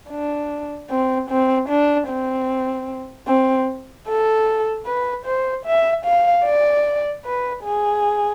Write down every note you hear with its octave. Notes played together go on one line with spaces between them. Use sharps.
D4
C4
C4
D4
C4
C4
A4
B4
C5
E5
F5
D5
B4
G#4